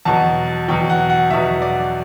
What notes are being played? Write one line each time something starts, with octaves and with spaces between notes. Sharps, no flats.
E2 B2 F#3 A5
E2 B2 F#3 G5
F#5
F#5
E2 B2 F#3 E5
D5